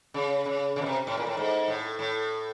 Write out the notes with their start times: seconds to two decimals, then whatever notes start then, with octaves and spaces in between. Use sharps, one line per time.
0.14 C#3
0.46 C#3
0.76 C#3
0.82 B2
0.86 C3
1.07 A2
1.17 A#2
1.27 A2
1.37 G#2
1.68 A2
1.99 A2